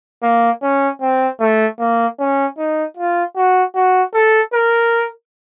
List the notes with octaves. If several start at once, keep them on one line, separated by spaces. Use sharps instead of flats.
A#3
C#4
C4
A3
A#3
C#4
D#4
F4
F#4
F#4
A4
A#4